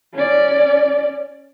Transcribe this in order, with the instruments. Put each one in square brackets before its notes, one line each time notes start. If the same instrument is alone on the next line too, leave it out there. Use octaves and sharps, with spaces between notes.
[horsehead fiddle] C#4 D5